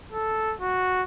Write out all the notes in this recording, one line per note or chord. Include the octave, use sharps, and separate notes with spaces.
A4
F#4